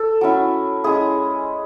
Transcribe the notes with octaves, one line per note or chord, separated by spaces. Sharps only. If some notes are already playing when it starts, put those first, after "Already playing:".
Already playing: A4
F#3 C#4 E4
G#3 C#4 E4 G#4